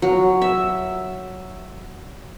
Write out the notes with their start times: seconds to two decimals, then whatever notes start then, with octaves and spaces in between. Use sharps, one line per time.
0.02 F#3
0.42 E5